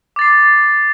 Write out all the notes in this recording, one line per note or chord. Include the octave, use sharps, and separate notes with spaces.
D6 A6 C7